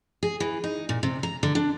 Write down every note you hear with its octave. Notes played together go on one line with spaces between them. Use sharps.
G#4
E3
D#4
A#2
C3
A#5
D3
D4